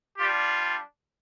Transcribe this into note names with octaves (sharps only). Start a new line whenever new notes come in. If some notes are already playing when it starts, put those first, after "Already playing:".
G3 D4 F4 G4